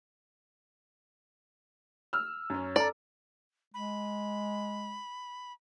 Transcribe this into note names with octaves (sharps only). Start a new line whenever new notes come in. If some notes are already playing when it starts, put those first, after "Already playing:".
E6 F6
F#2 C#4
A4 D5 A#5
G#3 B5